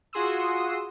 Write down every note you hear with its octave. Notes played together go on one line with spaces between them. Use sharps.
F4 F#4 G#4 C6 D#6 E6